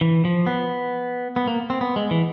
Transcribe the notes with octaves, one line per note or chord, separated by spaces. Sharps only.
E3
F3
B3
B3
A#3
C4
B3
G#3
E3